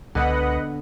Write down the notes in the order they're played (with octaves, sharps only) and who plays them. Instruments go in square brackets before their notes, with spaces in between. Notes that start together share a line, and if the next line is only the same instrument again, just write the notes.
[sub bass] C#2 [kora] D3 B3 [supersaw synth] B4 D#5 F#5